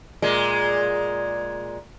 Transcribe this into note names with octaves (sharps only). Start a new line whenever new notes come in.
A#2 G#3